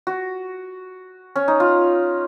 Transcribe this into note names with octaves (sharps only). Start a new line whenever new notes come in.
F#4
C#4
D#4
F4